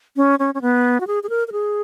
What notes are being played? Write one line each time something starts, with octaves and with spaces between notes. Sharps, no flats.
C#4
C#4
C#4
B3
F#4
G#4
G#4
A#4
A#4
G#4